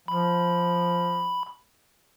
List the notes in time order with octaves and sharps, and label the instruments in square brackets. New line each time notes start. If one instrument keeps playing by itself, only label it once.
[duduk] F3 [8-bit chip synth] B5